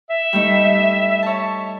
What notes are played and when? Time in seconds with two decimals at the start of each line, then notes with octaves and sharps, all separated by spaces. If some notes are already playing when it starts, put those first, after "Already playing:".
0.10 E5
0.33 G3 A3 D#4
1.23 C#5 A5